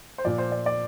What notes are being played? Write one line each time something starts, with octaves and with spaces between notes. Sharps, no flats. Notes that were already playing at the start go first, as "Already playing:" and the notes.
C5
A#2 F3 D5
C5
D5
D5